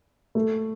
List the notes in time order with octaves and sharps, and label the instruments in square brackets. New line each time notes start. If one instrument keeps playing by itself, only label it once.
[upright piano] A3